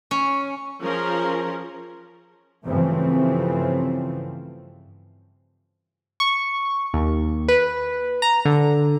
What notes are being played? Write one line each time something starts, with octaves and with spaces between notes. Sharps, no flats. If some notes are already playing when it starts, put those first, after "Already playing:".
C#4
F3 C#4 G#4 A#4
G2 C#3 E3 F3 A3 C4
C#6
D#2
B4
A#5
D3